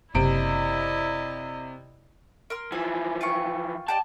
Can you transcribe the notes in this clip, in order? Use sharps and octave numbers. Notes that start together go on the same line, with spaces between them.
F#1 C3 E4 D5 D#5 D7
A#4 C6 F6
E3 F3 G#5
F4 G5 C#6
G4 D5 D#5 A5